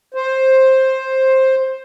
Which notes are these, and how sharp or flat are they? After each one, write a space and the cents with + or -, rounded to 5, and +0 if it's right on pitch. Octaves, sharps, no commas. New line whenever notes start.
C5 +10